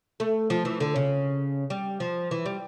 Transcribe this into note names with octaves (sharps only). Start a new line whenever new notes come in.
A3
F3
E3
D3
C#3
G3
F3
E3
G3